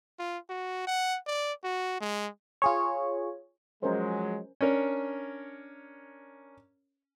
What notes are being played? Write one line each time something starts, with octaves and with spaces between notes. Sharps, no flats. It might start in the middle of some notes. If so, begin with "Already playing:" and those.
F4
F#4
F#5
D5
F#4
G#3
F4 G#4 C#5
F3 F#3 G#3 C#4 A#4 C5
C#4 D4 A#4 C#5